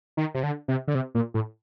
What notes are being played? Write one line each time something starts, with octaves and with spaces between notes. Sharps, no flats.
D#3
C3
D3
C3
D3
C3
A#2
A2